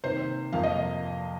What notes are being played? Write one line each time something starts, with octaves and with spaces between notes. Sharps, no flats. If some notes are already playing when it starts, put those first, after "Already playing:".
C3 D#3 A#3 C5
F2 C3 F3 A#3 F5
D#5